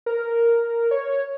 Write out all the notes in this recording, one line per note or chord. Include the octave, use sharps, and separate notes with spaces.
A#4
C#5